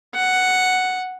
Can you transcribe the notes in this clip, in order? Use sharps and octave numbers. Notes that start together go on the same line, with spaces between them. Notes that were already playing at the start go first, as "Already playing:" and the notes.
F#5